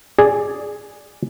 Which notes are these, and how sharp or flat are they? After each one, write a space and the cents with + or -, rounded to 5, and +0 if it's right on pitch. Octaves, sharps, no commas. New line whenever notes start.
G#4 +0 D5 +0